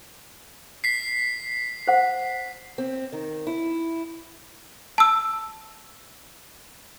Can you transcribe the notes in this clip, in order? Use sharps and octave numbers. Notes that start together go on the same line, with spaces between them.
B6 C7
C5 F#5
C4
D#3
E4
A5 E6